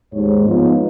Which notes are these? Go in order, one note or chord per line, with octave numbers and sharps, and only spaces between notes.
D#2 G#2 C#5
F3 B3 D#4 F4